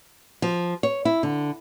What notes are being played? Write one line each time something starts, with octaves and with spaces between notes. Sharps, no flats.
F3
C#5
E4
D3